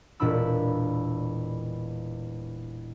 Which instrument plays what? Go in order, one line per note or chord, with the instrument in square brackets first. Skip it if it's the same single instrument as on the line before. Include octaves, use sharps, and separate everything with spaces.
[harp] E1 A#2 D4 B5 E6